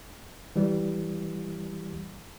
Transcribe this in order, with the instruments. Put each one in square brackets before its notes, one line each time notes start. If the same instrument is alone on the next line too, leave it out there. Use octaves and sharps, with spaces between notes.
[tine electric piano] E3 G3